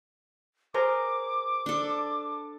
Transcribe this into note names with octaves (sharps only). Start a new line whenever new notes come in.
G#4 A#4 C5 D6
D4 A4